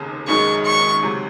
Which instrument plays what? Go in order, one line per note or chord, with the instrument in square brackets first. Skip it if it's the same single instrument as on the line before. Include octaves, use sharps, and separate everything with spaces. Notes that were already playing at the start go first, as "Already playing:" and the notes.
Already playing: [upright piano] F1 D#2 C#3
[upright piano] G#1 F#2 D#3 G#3 [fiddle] C#6
[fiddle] C#6
[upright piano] C#2 C3 F#3